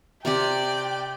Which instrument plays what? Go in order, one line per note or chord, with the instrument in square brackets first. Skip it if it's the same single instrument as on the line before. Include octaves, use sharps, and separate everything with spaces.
[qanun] C3 C4 G4 [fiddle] D5 [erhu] G5